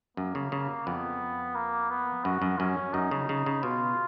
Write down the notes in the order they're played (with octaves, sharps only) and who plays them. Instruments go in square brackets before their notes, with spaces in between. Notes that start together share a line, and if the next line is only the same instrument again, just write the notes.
[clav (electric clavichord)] F#2 [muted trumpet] A#3
[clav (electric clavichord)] C#3
C#3
[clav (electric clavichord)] F2 [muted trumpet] B3
[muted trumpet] A#3
B3
[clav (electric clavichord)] F#2 [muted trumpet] F#4
[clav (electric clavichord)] F#2
[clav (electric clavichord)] F#2 [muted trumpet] C#4
[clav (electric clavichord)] F#2 [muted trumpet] D#4
[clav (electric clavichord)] C#3
C#3
C#3
[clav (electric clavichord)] B2 [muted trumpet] F4